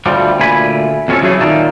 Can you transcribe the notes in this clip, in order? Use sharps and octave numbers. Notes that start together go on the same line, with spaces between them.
D2 B2 F3 G3
D2 A#2 A3 G#5 B5
F2 B2 C#4 E4 F#4 A4
C#3 E3 F#3 G#3 A3 G#4
A#2 D#3 A#3 D#4 A5